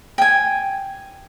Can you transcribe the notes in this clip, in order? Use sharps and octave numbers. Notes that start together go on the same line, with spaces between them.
G5 G#5